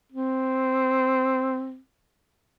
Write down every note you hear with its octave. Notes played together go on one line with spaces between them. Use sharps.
C4